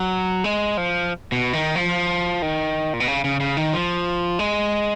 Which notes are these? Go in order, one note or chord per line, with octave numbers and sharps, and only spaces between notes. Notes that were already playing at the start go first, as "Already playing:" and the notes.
Already playing: F#3
G#3
F3
B2
D#3
F3
D#3
A#2
B2
C#3
C#3
C#3
D#3
F3
G#3